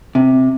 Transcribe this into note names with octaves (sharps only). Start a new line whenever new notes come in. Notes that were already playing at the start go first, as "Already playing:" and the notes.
C3